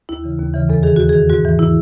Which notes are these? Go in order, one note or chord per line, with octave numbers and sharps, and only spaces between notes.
D#2 E4
C#3 E3
D#2
C#3 E3
E2 A4
D#3 G#4
E2 F#4
G#4
D#3
G#2 F#4
E3
E4